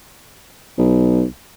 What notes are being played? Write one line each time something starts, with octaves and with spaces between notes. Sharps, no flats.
B1